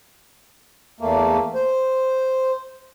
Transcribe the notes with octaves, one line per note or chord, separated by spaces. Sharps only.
E2 A3 A#3
C5